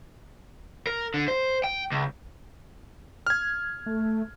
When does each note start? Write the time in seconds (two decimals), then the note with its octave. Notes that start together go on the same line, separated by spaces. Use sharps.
0.87 A#4
1.14 D3
1.28 C5
1.64 G5
1.92 C#2
3.27 F6 G#6
3.86 A3